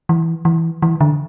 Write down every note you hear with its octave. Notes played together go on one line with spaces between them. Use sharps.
E3
E3
E3
D3